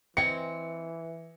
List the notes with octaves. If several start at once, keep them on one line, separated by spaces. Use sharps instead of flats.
E3 C4 D#5 G#5 C#7